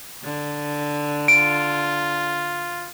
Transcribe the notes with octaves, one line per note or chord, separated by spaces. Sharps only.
D3
F4 D7